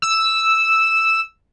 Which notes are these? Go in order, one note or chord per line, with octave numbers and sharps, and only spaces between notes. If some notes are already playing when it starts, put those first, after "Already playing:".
E6